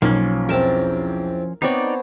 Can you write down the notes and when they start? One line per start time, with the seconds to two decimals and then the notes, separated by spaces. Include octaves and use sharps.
0.02 B1 F3 A#3 C#4
0.49 E2 C4 A#4 A5
1.62 B3 C4 D4 D#4 C#5 D5